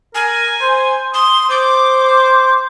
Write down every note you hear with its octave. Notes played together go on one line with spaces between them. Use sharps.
A#4 G#5
C5
C6 D#6
C5 D6